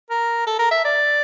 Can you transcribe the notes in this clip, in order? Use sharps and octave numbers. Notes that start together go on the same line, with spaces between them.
A#4
A4
A#4
E5
D5